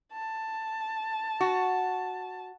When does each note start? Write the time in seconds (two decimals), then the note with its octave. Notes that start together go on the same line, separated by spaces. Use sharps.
0.12 A5
1.41 F#4